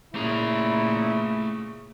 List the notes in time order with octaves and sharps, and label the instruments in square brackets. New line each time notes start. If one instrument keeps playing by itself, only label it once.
[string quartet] A#2 C#3 [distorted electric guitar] A3 A#5 [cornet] E4